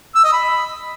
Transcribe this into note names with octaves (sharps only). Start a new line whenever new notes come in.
E6
D#5
B5